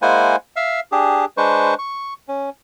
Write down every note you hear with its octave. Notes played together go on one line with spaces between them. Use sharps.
G#3 A#3 E4 C5 F#5 G#5
E5 F5
D4 G4 G#4
G#3 D4 B4 C5 C#6
C#6
C#4